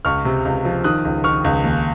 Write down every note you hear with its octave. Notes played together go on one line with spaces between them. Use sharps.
C#2 C#6 F6
C3
C#2
F3
D#3 D#6 F#6
C#2
D#3 C#6 F6
C#2
D#2